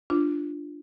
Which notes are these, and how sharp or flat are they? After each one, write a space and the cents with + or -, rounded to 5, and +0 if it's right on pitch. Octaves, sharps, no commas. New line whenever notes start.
D4 +0 F4 -15